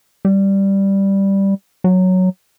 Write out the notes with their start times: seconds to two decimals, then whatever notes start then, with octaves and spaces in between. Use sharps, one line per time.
0.25 G3
1.84 F#3